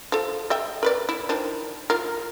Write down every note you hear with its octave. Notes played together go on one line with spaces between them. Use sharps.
F3 A4
D#5 E5 G5
A#4 B4 D5
E4
D#3 F3 D4
F4 A#4